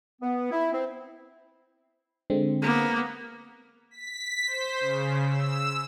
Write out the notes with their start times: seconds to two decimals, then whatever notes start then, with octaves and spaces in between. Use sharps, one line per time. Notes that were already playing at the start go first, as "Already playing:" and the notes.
0.22 B3
0.51 E4
0.72 C4
2.30 D3 G#3 C4
2.62 A#3 B3
3.91 B6
4.47 C5
4.80 C#3
5.30 E6